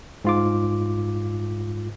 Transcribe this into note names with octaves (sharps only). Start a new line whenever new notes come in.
G#2 F4 D6